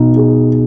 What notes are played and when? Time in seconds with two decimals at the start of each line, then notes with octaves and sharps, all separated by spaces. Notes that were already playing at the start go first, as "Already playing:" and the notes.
Already playing: B2 D#4
0.16 G#4